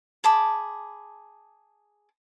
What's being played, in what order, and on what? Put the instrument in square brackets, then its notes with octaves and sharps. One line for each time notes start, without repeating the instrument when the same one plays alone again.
[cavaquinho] G#4 A5 B5 D6